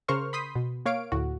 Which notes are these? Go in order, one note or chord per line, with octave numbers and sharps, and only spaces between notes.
C#3 A#4 C5 C#6 F6
B5 C6 D#6 G6 B6
B2
A#3 C#5 F5 D7
D2 A2 F#4